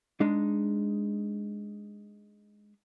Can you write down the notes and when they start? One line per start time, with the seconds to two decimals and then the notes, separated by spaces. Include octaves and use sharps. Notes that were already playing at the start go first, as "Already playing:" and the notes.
0.20 G#3 D4 D#4